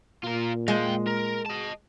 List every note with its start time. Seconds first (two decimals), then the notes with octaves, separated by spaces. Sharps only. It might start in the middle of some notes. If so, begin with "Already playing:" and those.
0.24 A#2 F4 A#4
0.68 G#3 F5 G5
1.07 A#4
1.46 D#5 A5